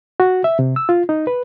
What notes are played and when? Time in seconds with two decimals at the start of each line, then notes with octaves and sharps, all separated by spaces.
0.20 F#4
0.44 E5
0.59 C3
0.76 E6
0.89 F4
1.09 D#4
1.27 B4